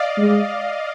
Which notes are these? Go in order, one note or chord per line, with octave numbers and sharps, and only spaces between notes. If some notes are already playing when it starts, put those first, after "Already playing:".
Already playing: D5 D#5 F5
G#3